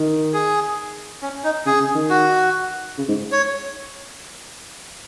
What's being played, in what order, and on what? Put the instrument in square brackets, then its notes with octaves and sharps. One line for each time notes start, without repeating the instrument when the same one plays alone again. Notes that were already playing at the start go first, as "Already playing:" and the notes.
Already playing: [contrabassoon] D#3
[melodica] G#4
C#4
D#4
[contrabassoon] C#3 [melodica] G#4
[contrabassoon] C#3
D#3
[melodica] F#4
[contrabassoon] C#3
G#2
[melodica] C#5